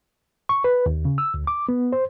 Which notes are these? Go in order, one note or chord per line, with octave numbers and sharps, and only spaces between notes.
C#6
B4
D#2
C#3
E6
D2
D6
B3
C5